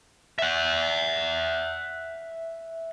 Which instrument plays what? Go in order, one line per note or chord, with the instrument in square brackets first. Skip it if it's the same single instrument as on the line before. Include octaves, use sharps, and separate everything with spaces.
[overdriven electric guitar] E5 F#5